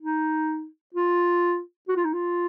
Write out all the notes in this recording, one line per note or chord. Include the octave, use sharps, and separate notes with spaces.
D#4
F4
F#4
F4
D#4
F4